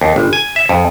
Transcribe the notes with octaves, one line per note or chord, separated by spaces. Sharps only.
D#2
G1
G#5
E5
F2